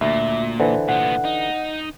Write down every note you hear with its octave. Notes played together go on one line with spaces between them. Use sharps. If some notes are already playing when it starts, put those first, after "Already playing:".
D2 A#2 E5
D3 E3 C5
A#2 B3 F#5
D#4